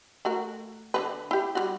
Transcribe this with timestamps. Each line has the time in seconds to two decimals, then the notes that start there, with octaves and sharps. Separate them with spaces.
0.25 A3 F#4 A#4
0.94 D3 A#3 B4
1.31 E4 G4
1.55 G3 F4 F#4